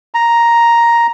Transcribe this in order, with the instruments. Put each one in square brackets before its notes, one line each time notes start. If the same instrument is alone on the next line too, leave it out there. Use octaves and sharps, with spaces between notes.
[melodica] A#5